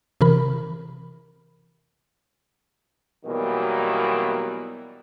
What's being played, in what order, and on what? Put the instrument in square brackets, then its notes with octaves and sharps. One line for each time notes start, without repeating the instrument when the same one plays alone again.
[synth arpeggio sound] C3 E3 A#4 B5
[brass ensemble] B2 D#3 E3 F#3 G3 A#3